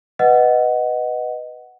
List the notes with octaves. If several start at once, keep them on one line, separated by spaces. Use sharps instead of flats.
B4 D#5 F#5